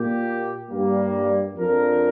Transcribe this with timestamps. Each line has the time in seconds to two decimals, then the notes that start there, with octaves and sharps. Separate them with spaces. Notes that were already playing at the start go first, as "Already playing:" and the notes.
Already playing: A#2 A#3 G4
0.70 G2 G3 A#3
1.57 F2 F3 D4 A#4